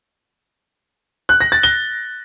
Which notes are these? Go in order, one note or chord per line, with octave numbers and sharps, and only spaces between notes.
F#6
A#6
A6
G7